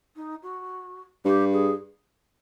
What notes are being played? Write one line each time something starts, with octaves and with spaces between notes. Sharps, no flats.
D#4
F#4
G2 G4
G#4